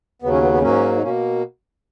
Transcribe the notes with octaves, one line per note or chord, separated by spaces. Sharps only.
D#2 C#3 F#3 B3
C#4
B3
B3
G#2 F#3 A#3 C#4
D#4
B2 A#3 C#4